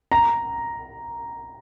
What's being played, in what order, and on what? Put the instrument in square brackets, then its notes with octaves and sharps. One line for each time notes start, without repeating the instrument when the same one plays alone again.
[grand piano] A#5